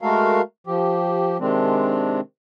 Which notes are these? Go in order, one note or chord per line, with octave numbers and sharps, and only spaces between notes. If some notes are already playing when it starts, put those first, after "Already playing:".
G#3 A3 F#4 A4 A#4 F5
F3 G4
C3 D#3 G#3 C4 D4